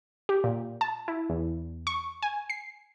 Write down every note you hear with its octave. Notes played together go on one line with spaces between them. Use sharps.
G4
A#2
A5
E4
E2
C#6
G#5
C7